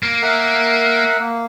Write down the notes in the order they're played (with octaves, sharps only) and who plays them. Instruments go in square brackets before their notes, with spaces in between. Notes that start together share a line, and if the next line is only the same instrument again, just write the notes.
[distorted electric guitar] A#3
[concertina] A#4 E5 F#5
A#3